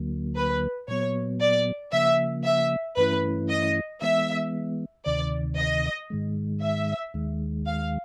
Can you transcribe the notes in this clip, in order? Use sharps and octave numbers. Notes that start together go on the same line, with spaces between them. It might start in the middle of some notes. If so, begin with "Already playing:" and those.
Already playing: D2 D3 F#3 A#3
B4
A#2 F#3 B3 C#5
D5
C#3 F3 A#3 E5
E5
G2 E3 A3 C#4 E4 B4
D#5
E3 G#3 B3 E5
D2 C3 D#3 D5
D#5
G#2 D#3 G#3
E5
D#2 D#3 G#3
F5